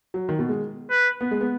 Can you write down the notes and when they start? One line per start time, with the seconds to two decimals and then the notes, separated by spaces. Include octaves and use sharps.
0.14 F#3
0.29 D#3
0.39 B2
0.49 G#3
0.90 B4
1.21 B3
1.31 G#3
1.41 B3